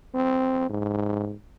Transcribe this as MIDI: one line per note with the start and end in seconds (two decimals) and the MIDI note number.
0.14 0.68 60
0.69 1.35 44